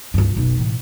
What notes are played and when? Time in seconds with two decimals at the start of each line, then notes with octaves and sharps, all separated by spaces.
0.14 C#2 G2
0.35 F#1 B1
0.58 A2 E3